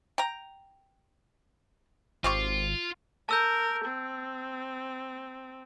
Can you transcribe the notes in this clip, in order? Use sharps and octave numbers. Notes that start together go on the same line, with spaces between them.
G5 A#5
G#1 C4 F4 G4 C#6
A#4 A5 E6 G6
C4